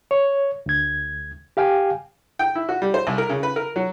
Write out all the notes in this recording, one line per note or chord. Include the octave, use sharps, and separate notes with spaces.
C#5
D2 G#6
G4 F5 G5 G#5
G5
E4
F#4
G3
C5
C2
A#4
C#3
B4
A#4
F#3